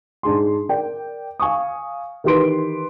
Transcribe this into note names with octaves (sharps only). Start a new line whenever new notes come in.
G#2 D4 G#4 C6
A#4 D5 G5
F5 G#5 C#6 D#6
D#3 E3 G4 B4 C6 D7